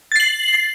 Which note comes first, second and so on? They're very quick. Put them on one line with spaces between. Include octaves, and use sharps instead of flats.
A6 C7 F#7